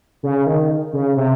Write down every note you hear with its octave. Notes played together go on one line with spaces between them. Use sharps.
C#3
D#3
C#3
C3